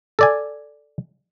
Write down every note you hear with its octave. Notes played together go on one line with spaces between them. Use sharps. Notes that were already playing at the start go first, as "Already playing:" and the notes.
A4 D5 G#5